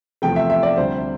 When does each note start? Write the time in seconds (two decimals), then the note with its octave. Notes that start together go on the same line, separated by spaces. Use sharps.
0.22 E2 C3 F3 A3 G5
0.36 E5
0.50 E5
0.63 D5
0.77 D2 C3 G3 C5